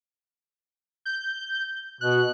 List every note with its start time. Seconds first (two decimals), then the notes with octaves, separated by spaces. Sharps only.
1.05 G6
2.01 B2 F#6